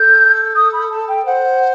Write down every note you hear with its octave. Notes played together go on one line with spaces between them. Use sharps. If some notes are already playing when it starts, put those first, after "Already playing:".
Already playing: A4 G6
D#6
B5
A5
G5
C5 F#5